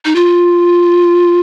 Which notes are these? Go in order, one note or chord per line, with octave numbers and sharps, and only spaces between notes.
D#4
F4